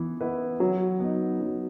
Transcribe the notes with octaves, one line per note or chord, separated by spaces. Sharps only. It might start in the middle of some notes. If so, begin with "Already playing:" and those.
Already playing: E3 B3 E4
B3 E4 B4
F#3
B3 D#4
F#3